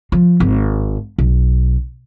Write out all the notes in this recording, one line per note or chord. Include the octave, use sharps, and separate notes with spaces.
F3
G#1
B1